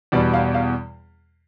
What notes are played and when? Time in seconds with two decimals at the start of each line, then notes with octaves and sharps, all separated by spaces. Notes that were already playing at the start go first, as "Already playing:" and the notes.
0.12 E2 B2 G3 D5
0.34 F5
0.54 F5